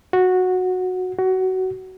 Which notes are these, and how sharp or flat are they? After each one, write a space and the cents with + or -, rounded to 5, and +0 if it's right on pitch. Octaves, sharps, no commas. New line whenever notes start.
F#4 -10
F#4 +20